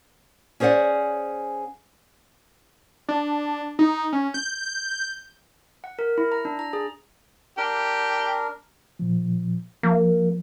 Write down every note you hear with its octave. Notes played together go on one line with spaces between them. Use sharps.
C#4 G#4 C5 D5 F#5
D4
D#4
C#4
G6
F#5
A#4
E4
A#5
D4
A#5
G#4
D4 G4 A#4
A#2 F3
F3 A#3